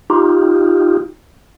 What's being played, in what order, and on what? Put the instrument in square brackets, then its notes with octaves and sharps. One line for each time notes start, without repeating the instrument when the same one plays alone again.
[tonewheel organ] D#4 F4 G4